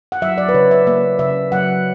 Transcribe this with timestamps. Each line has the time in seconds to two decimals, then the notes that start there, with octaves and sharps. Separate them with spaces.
0.12 F#5
0.22 F#3 E5
0.38 D5
0.49 B4
0.54 C#3 C#5
0.71 E5
0.87 A#3 E5
1.19 C#3 E5
1.52 F#3 F#5